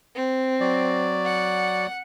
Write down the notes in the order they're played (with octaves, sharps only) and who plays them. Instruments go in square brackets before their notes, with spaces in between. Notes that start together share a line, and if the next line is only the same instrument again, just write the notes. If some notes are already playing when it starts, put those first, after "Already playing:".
[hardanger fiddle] C4
[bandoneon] F#3 D5
[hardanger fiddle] F#5